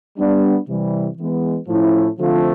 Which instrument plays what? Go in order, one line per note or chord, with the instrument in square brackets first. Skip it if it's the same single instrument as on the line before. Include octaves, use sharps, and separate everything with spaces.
[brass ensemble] G3 B3 D4
C3 E3 G3
E3 G#3 B3
A2 F3 A3 C#4 E4
D3 F3 A3 C4 F4